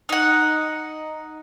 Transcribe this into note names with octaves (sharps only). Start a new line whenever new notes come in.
D#4 F#5